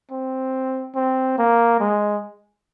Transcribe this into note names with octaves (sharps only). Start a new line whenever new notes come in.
C4
C4
A#3
G#3